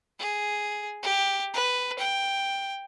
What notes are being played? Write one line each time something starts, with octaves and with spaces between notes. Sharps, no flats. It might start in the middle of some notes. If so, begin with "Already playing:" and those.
G#4
G4
B4
G5